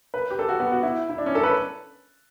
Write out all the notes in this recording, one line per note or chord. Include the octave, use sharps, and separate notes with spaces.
B4
G4
A4
F#4
B3
F#4
E4
E4
D4
C#4
A4
B4